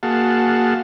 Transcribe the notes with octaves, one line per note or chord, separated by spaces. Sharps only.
A#3 F#4 G#4 F5 F#5 A5